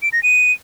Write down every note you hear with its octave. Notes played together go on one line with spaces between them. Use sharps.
D7
A#6
D#7